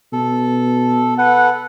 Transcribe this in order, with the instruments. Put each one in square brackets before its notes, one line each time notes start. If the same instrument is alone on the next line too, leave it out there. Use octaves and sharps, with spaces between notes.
[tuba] B2 [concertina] A4
[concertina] A4 B4 [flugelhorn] F#5